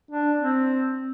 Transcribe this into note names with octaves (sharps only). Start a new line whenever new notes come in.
D4
C4